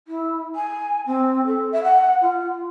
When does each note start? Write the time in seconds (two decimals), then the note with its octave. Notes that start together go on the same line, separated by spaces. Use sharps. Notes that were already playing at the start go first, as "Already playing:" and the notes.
0.08 E4
0.55 G#5
1.06 C4
1.46 A4
1.72 E5
1.84 F#5
2.22 F4